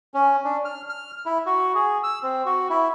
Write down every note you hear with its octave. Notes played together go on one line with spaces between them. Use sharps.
C#4
D4
F6
F6
E4
F#4
G#4
E6
C4
F#4
E4